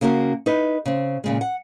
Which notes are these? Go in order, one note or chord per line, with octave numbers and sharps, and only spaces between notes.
C#3 A#3 C#4 F#4 A#4
D#4 E4 B4
C#3 C4
A#2 C#3 G#3
F#5